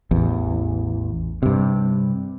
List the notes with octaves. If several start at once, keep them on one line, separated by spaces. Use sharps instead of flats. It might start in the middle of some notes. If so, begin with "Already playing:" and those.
A1 E2
G2 C3